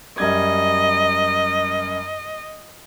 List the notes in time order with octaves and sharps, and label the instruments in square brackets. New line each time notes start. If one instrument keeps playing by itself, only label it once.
[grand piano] F#2 G3 G#6 [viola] D#5